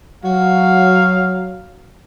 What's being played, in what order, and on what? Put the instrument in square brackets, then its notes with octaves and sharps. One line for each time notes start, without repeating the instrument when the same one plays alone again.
[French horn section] F#3 [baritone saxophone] F#4 [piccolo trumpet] F5